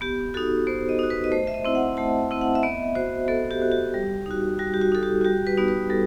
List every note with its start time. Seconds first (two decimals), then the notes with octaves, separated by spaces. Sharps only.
0.01 B3 G4
0.34 D#4 F#4 A4
0.67 B3 C5
0.89 D#5
0.99 D#4 F#4
1.10 B4
1.24 D#5
1.32 A3 C5
1.47 E5
1.54 D#5
1.65 C4 E4
1.75 F#5
1.97 A3 A5
2.31 C4 E4
2.41 F#5
2.55 E5
2.63 B3 D#5
2.95 F#4 C5
3.28 B3 A4
3.51 G4
3.62 F#4
3.72 G4
3.94 G3
4.26 D#4 F#4
4.59 G3 F#4
4.74 G4
4.81 F#4
4.92 D#4 F#4 A4
5.03 G4
5.21 F#4
5.24 G3 G4
5.47 B4
5.57 B3 D#4 F#4
5.68 B4
5.90 G3 A4